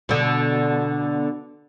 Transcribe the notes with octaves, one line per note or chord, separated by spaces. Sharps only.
B2 D3